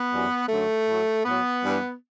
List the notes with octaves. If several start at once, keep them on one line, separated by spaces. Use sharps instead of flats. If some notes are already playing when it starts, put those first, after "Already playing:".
Already playing: B3
F#2 E3 G3
F#2 D3 F#3 A3
A2 F#3
A2 F#3 B3
G2 E3 G3